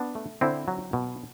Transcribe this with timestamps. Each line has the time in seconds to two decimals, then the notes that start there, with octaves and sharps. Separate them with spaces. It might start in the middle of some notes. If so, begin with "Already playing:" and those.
Already playing: B3 D4
0.15 A3
0.41 D3 C4 E4
0.68 F#3
0.93 B2